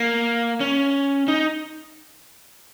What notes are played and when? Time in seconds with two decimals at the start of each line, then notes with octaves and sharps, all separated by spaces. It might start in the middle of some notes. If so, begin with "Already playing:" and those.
Already playing: A#3
0.60 C#4
1.28 D#4